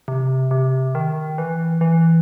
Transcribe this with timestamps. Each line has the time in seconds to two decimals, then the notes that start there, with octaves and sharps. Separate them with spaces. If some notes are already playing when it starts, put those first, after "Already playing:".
0.08 C3
0.51 C3
0.95 D#3
1.38 E3
1.81 E3